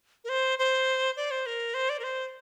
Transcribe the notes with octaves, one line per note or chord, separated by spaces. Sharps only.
A#4
C5
C5
D5
C5
A#4
C5
D5
A#4
C5